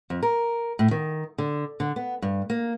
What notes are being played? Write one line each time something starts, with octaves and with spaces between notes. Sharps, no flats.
F2
A#4
A2
D#3
D3
D3
B3
G2
A#3